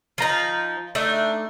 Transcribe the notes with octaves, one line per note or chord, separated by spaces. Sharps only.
F3 D#4 F4 A#5
A3 D4 D#4